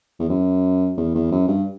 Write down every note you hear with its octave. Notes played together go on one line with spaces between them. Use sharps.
E2
F#2
E2
E2
F#2
G2